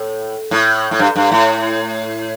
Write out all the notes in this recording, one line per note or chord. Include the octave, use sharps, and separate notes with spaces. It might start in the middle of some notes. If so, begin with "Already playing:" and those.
Already playing: A2
A2
A2
G2
G2
A2